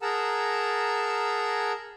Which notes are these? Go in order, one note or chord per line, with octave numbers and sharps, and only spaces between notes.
G#4 A#4 F#5 A5 A#5 E6